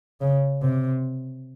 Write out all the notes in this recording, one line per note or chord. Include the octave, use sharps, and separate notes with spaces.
C#3
C3